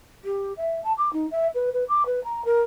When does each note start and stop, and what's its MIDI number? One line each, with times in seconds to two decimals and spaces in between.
0.24 0.52 67
0.57 0.82 76
0.84 0.92 81
0.97 1.11 86
1.13 1.26 63
1.31 1.47 76
1.54 1.69 71
1.73 1.84 71
1.88 2.03 86
2.05 2.22 71
2.23 2.44 82
2.45 2.62 70